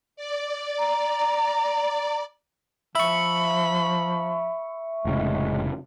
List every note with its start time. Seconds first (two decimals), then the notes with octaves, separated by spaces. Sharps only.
0.16 D5
0.79 A#5
2.95 F3 E5 B5 C#6
5.05 F1 A2 C#3 G#3